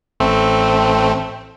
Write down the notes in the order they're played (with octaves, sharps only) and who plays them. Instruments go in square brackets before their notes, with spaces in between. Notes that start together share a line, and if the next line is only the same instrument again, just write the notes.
[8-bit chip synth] A1 A3 C4